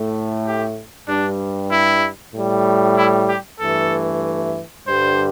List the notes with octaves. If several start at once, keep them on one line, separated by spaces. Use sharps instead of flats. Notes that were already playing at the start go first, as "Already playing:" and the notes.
Already playing: A2 A3
G4
G2 G3 D4
E4
A2 G3
E4
G4
G2 E3 A3 A4
G2 D3 G3 C5